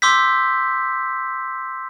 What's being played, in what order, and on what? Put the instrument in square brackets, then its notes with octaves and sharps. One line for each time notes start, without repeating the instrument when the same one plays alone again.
[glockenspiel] C6 D6 E6 G6 B6